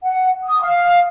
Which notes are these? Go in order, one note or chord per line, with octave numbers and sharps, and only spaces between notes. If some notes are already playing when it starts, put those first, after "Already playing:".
F#5
D#6
F5